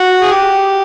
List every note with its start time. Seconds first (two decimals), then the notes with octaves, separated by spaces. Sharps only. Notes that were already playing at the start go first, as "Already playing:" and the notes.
Already playing: F#4
0.22 G#4
0.31 G4